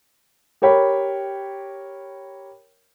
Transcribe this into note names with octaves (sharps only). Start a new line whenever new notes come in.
G4 A#4 C#5 G5 B5